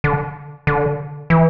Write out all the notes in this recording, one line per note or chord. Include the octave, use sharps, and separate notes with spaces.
D3
D3
E3